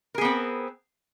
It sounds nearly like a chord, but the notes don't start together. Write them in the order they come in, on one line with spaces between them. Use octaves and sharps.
A#4 G#4 B3 C4